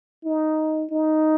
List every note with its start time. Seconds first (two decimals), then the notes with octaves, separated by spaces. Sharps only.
0.24 D#4
0.91 D#4